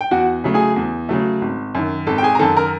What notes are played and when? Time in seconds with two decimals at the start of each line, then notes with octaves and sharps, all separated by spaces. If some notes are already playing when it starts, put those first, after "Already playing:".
0.01 G5
0.11 E2 F#4 F#5
0.44 C#3 F#3 A3
0.54 G#4 G#5
0.76 E2
1.09 C#3 F#3 A3
1.42 G#1
1.75 F#2 D#3
2.07 G#1 A4 A5
2.18 G5
2.23 G#4 G#5
2.35 A#5
2.39 F#2 D#3 A4 A5
2.57 A#4 A#5